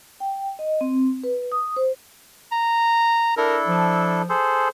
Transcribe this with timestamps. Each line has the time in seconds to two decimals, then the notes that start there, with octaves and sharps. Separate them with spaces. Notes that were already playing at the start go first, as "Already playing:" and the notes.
0.20 G5
0.59 D#5
0.81 C4
1.24 B4
1.52 D#6
1.76 C5
2.52 A#5
3.37 D4 E4 A4 A#4
3.67 F3
4.29 G#4 A4 C5